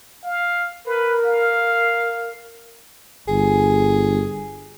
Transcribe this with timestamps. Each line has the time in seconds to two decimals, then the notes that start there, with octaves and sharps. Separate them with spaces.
0.23 F5
0.86 A#4 B4
1.25 F5
3.28 G1 G#4